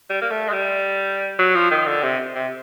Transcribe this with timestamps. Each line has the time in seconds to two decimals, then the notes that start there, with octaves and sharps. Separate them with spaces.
0.10 G3
0.21 A#3
0.31 A3
0.49 G#3
0.53 G3
1.39 F#3
1.55 F3
1.71 D#3
1.87 D3
2.03 C3
2.35 C3